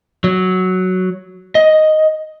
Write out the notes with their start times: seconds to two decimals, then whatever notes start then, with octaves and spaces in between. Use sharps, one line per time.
0.24 F#3
1.55 D#5